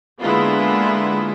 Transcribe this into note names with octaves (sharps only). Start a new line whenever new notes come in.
D3 G#3 A#3 B3 E4 F4